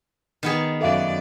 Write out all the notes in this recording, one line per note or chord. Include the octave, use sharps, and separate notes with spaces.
D#3 B3 G#4
F#2 A4 D5 E5 F5